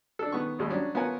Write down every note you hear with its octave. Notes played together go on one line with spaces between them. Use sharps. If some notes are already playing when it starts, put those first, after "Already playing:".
D4 A4
D#3 B3 G#4 C#6
G#1 D#2 G3 G#3
F#3 C#4 D4
B3 F4 A#4 C#5 G#5